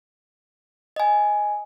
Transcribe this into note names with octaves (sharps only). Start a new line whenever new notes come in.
D#5 G#5